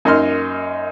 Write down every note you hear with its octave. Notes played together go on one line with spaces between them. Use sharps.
F#2 A#3 D#4 D#5 C6 F6